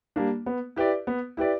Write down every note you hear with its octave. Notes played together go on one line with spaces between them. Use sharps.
G3 A#3 D4
B3
E4 G4 B4 D5
B3
E4 G4 B4 D5